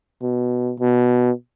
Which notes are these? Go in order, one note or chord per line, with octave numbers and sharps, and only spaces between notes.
B2
B2